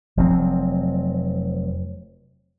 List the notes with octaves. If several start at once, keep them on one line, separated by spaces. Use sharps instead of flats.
F1 F3 F#3 C4